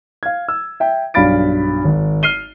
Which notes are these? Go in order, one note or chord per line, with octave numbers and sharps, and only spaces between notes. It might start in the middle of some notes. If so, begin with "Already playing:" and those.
F5 G#6
E6
E5 G5
B1 G2 F5 B5 A6 D7
G#1
F6 C7 D#7 G7